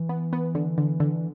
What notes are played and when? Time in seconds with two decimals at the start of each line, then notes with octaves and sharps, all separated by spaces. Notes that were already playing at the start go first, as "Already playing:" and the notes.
Already playing: E3
0.09 B3
0.33 B3
0.55 D3
0.78 D3
1.00 D3